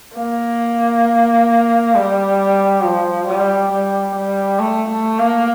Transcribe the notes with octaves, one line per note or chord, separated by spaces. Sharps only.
A#3
G3
F3
G3
G3
G3
A3
A3
A#3